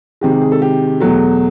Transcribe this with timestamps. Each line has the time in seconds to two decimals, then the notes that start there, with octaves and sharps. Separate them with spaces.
0.21 C3 D#3 G#3 G4
0.32 G4
0.42 G#4
0.52 A4
0.62 G4
1.00 E2 B2 F#3 A3